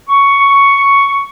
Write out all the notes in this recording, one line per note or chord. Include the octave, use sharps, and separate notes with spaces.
C#6